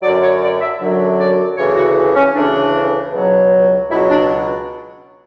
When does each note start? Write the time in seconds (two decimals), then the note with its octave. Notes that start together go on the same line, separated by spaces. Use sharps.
0.02 F#2 D3 F#3 D5
0.22 C#5
0.41 D5
0.61 E5
0.80 F#2 D3 F#3
1.18 D5
1.57 D2 C#3 E3 C#5
1.76 F#4
2.15 C#4
2.34 D2 C#3 E3 D4
3.12 C#2 B2 F#3
3.89 C#2 B2 F#3 E4
4.09 D4